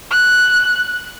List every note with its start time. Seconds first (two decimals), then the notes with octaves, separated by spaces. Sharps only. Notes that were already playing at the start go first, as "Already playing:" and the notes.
0.11 F#6